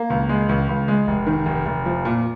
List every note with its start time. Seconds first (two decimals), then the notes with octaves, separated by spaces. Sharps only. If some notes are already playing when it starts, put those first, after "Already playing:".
Already playing: A#3
0.10 C#2
0.29 G#3
0.49 C#2
0.69 C#2
0.88 G#3
1.07 F1
1.27 D#3
1.46 F1
1.66 F1
1.86 F3
2.05 A#2